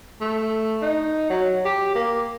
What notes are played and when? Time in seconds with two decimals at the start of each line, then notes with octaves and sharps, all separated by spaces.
0.21 A3
0.82 D#4
1.30 F#3
1.65 G4
1.95 A#3